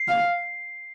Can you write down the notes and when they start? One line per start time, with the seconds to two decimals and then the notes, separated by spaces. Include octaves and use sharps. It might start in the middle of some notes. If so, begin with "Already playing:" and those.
Already playing: C7
0.08 F5